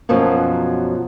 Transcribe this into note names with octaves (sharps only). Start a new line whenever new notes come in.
F#2 B2 F3 F#3